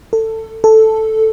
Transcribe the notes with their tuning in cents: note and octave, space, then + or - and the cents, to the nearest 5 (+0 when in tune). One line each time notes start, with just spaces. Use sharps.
A4 +20
A4 +0